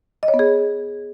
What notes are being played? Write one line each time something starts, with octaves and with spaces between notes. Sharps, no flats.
D#5
C#5
B3
G#4